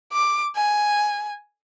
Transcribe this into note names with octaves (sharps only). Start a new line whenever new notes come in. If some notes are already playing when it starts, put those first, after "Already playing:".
D6
G#5